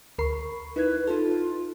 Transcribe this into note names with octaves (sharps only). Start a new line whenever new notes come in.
D2 A#4 B5 C#6 C7
D#4 E4 B4 G#6
D#4 F4 A4